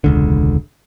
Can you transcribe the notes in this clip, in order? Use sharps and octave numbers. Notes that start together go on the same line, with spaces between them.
E1 C#2 D3